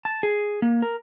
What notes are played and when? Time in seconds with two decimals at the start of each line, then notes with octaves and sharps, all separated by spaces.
0.05 A5
0.23 G#4
0.62 A#3
0.82 A#4